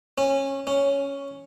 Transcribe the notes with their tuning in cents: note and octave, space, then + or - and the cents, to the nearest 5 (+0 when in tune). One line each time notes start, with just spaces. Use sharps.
C#4 -20
C#4 +5